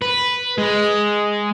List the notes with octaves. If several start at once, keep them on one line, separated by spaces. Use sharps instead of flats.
B4
G#3